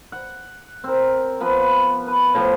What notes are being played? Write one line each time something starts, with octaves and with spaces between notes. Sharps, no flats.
F#5
C4 A#4
F3 B3 B4
B4
A2 F3